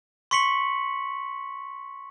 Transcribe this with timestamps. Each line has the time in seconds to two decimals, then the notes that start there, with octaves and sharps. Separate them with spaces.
0.31 C6 C#6 B6 C#7 F#7